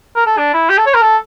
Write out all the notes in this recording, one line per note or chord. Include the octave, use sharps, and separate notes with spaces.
A#4
A4
D4
E4
G4
A4
C#5
A#4
A4